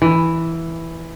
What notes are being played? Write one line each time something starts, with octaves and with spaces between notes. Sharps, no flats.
E3